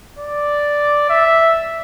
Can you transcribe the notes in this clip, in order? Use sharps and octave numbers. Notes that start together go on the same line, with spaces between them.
D5
E5